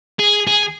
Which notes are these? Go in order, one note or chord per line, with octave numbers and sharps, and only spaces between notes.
G#4
G#4